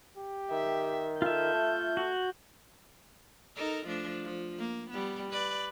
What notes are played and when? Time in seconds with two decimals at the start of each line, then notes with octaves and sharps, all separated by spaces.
0.18 G4
0.51 D#3 E5
1.22 F4 A4 E5 G6
1.53 A3
1.97 F#4
3.56 D#4 A4 A#4
3.86 F3 A3 D4
4.24 F3
4.59 A#3
4.90 G3 B3
5.31 B4 D5